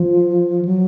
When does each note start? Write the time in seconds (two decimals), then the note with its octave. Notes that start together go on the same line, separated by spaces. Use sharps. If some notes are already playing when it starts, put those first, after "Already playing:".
Already playing: F3
0.65 F#3